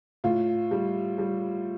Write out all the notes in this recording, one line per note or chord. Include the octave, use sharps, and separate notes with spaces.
A2 F4
G3
G3